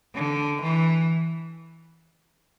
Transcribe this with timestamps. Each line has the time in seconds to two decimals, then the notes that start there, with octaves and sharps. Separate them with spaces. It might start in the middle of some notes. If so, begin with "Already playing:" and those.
0.15 D3
0.62 E3